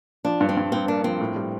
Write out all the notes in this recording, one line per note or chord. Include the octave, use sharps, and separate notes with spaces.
F3 D4
G2
C4
G2
G2 C4
A#3 D4
F3 C4
A2
G3